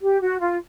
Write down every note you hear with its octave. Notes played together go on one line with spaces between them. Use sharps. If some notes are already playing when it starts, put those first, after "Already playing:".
G4
F#4
F4